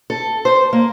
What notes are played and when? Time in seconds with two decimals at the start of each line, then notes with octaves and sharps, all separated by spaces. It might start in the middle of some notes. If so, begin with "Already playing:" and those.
0.10 A4
0.45 C5
0.73 A#3